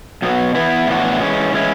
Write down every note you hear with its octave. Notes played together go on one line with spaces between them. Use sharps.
B2 F#3 B3
E3 B3 E4
A2 E3 B3 D4 F#4
E3 G#3 C#4
E3 G#3 C#4 E4